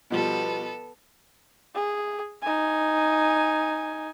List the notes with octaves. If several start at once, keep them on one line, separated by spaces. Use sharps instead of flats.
B2 F3 G3 B3 A4
G#4
D#4 G#5